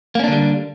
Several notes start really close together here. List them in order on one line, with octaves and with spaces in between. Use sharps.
A#3 C#4 D4 D3 G3